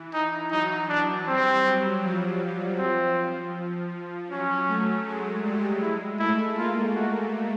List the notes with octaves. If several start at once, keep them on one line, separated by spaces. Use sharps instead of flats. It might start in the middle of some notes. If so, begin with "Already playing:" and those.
Already playing: E3
D#4
F#3 D#4
D4
G3 C4
F#3
F3
C4
F#3 C#4
A3
G#3
G3
G#3 E4
A3 E4
A#3 F4
F#4